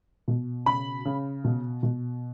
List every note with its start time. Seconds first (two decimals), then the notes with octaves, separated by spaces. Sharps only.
0.28 B2
0.66 C#3 B5
1.05 C#3
1.44 B2
1.83 B2